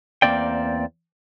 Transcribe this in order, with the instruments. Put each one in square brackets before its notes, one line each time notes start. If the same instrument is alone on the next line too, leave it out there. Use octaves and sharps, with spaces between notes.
[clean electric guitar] E2 D3 A#3 C4 D5 G5